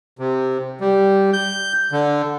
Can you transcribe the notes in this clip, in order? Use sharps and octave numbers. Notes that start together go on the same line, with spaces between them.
C3
G3
G6
D3